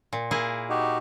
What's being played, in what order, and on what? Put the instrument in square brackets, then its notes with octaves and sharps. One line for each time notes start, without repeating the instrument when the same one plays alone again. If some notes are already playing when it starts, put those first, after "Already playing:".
[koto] A#2
A#3 E4 G#4
[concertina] D#4 F#4 G4